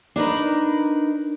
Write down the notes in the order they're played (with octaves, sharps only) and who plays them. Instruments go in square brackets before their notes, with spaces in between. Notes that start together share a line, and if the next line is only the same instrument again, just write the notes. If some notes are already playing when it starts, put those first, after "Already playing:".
[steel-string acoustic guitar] D4 D#4 A#4 B4